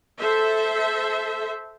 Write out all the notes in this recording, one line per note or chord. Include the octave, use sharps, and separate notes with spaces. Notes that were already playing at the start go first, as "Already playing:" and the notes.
A4 C5 E5